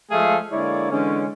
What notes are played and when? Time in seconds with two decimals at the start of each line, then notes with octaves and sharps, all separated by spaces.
0.11 F3 G#3 A3 G#4 A4 F5
0.52 D3 G#3 A#3 E4 C#5 D5
0.91 D3 E3 G#3 C#4